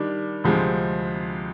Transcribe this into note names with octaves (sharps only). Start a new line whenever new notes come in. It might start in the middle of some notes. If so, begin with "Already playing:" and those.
Already playing: D#3 G3 D4
D2 C3 F3 G#3 C4